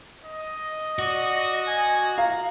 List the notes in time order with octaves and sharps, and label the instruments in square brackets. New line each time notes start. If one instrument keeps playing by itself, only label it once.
[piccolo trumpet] D#5
[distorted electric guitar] F#4 [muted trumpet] D5
[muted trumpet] G#5
[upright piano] F5 [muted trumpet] A#5